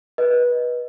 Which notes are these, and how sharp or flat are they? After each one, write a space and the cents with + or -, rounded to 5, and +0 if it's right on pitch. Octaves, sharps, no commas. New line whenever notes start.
B4 -20 D#5 +0